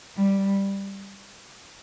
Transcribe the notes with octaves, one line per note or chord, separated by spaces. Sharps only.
G3